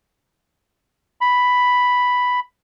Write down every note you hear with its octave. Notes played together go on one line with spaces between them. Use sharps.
B5